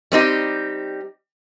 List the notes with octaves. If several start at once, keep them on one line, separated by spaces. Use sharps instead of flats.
G3 C4 D#4 G4